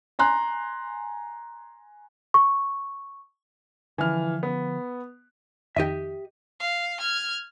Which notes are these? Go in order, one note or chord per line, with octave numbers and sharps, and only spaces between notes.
G#5 A#5 C6 F#6
C#6
D3 E3 F3 F6
B3
F2 D#3 D#4 G4 D#5 E5
F5
F6 G#6